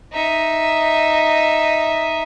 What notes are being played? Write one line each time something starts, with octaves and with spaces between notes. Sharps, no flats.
D#4 E5